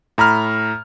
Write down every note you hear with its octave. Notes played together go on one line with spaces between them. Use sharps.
A2 A#5 B5 F6